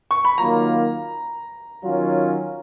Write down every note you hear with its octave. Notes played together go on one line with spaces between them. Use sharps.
C#6
B5
D#3 F#3 A#3 F4 A#5
D#3 F#3 C#4 F4